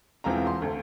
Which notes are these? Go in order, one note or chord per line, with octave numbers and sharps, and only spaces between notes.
E1 E3 C4 F4 A#5
C6
D2